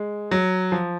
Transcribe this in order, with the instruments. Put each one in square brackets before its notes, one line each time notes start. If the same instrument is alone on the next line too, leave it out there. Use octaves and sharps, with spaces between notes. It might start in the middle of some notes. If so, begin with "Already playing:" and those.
Already playing: [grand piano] G#3
F#3
F3